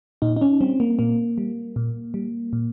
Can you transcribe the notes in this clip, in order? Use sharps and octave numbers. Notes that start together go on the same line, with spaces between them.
A#2 D#4
D#4
C#4
G3 C4
A#3
A#2 A#3
G3
A#2
G3
A#2